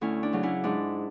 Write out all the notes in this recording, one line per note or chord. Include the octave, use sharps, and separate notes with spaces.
D2 C#4 E4
D4
C#3 F#3
C#4 E4
G#2 D4